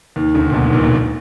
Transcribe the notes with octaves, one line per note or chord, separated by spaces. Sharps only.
D#2 D#3
D2 D3
A#2
B1 B2
G#2
A#1 A#2
B1 B2